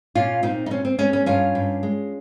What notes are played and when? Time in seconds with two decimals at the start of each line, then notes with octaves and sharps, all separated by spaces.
0.15 A#2 C#4 F4
0.43 A#2 C4 D#4
0.66 D#4
0.71 C4 C#4
0.85 C4
0.98 G#3 C#4
1.13 C#4
1.26 G2 C#4 F4
1.55 G2
1.83 G#3